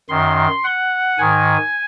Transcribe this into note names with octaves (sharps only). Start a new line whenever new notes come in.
F#2 D#3 C6
F#5
G#2 D#3 G#5